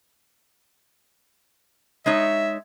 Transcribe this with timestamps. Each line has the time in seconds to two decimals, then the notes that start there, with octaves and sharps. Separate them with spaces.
2.06 G#3 D#4 C#5 E5